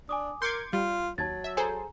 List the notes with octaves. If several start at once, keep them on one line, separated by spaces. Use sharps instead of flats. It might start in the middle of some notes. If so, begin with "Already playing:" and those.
D4 G#5 D6 D#6
A#4 C6 D6 G6 G#6 C#7 D7
G3 F4
D#2 F#3 A5 G#6 A6
E5
G#4 A4 C5 G#5 A#5